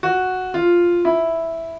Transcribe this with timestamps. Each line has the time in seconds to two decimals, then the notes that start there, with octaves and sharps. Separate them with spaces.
0.03 F#4
0.54 F4
1.05 E4